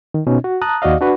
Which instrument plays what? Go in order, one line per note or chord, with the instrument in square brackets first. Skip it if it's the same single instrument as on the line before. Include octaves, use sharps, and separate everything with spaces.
[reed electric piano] D#3
B2 C#4 D#4
F#4
A5 A#5 D#6 F#6
D#2 F#4 D5 D#5 F5
D4 F#4 B4